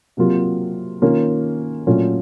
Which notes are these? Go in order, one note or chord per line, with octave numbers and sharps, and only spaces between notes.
C3 F#3 A#3 F4
D#3 A#3 C#4 F4
A#2 F#3 A3 C#4 F4